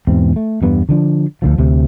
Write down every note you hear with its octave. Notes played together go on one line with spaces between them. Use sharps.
E2 G#2 B2 C4
A3
E2 G2 B3
D3 F3 D4
D2 D3 F3
D2 C3